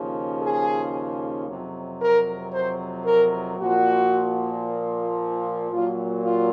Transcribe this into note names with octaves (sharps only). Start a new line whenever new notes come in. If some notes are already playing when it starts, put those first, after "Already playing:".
Already playing: D#2 C#3 F3
G#4
F2 C3 F#3
A#4
C5
A#4
A#2 F3 F#4
A#2 F#3 F4
F4